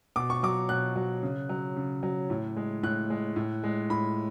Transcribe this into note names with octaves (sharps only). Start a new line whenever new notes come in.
B2 D6
C#6
F#3 D6
B2 F#6
F#3
C#3
F#3
C#3
F#3
A2
G#3
A2 F#6
G#3
A2
G#3
A2 B5